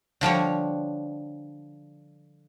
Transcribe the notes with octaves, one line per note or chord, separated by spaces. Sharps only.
D3 F3 G3 C#5